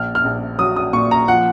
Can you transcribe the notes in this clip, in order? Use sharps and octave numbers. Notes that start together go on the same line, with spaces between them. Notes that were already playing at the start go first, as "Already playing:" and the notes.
Already playing: A#1 F6
F6
A#1
F#3 D#6
D#6
A#2 C#6
A#5
F3 F#5